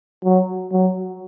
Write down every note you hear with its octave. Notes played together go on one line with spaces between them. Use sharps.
F#3
F#3